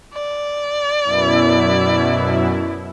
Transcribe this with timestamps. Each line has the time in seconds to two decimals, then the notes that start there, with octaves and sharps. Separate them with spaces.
0.13 D5
1.04 F#2 B2 E4